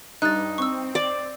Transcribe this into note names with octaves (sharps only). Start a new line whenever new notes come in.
G2 D#4 F#6 A6
C4 C#6 E6
D5